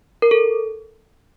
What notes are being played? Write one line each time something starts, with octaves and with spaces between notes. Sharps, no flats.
A#4
A4